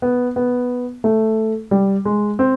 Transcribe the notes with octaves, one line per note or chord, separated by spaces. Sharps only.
B3
B3
A3
G3
G#3
C4